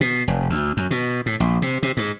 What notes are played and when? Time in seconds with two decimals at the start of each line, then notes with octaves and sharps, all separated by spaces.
0.01 B2
0.28 F1
0.50 D2
0.77 F#2
0.91 B2
1.26 A2
1.40 A#1
1.62 C3
1.83 C3
1.97 G#2